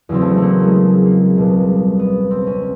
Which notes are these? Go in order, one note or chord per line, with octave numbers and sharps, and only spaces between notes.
E2 C#3 F#3 C4
A3
A3
A#3
G#3 A3
A#3
C#2 B2 G3
B3
C4
C#4